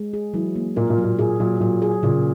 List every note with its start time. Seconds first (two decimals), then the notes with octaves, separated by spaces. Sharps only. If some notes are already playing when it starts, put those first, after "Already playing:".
Already playing: G#3
0.13 G#4
0.34 E3 F#3
0.56 A#3
0.76 A#2 A#4
0.90 A#2
0.98 F#3
1.04 A#2
1.19 A#2 G#4
1.40 A#2 F#3
1.60 A#2 F#3
1.82 G#4
2.03 A#2 C#3